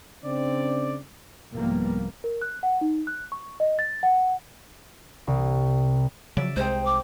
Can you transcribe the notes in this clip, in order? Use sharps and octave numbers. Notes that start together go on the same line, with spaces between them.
C#3 C4 D4 D5
C2 G#2 F3 G3 A#3 B3
A#4
F#6
F#5
D#4
F#6
C#6
D#5
A6
F#5
C2
C#3 F3 F#3 D5 E5
C2 C3 G#3 C4 D#4 C5
D6